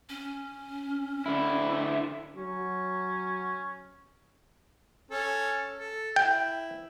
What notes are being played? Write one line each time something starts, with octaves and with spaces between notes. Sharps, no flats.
C#4
D3 E4
F#3 C#4
C#4 A4
A4
E4 G5